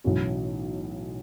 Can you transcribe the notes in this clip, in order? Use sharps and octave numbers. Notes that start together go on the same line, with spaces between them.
B1 A2 E3 C#4 F#4